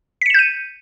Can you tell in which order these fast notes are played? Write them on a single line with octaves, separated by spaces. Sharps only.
B6 C#7 E7 G6 D#7